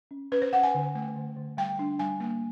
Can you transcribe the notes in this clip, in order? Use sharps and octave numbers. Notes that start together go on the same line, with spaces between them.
C#4
C#4 B4
C5
C#4 F#5
G#5
D3
A3
D3
D3
G3 G5
D4
G3 G#5
A#3